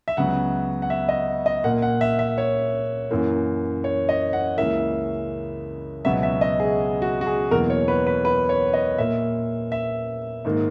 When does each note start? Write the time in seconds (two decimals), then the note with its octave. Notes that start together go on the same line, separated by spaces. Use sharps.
0.08 E5
0.17 C#2 C#3 F#3 B3 F#5
0.82 F#5
0.90 E5
1.09 D#5
1.46 D#5
1.64 A#2 A#3 F#5
1.82 F#5
2.01 E5
2.19 E5
2.38 C#5
3.11 F#2 E3 A#3
3.84 C#5
4.09 D#5
4.33 F#5
4.58 C#2 C#3 E3 A#3 E5
6.05 C#2 B2 F#3 B3 E5
6.23 E5
6.41 D#5
6.60 G#4
7.02 F#4
7.21 F#4
7.27 G#4
7.51 E2 B2 F#3 A#3 A#4
7.70 C#5
7.88 B4
8.07 B4
8.25 B4
8.49 C#5
8.74 D#5
8.98 A#2 A#3 E5
9.72 E5
10.45 G#2 D#3 A#3